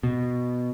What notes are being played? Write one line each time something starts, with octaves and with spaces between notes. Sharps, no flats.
B2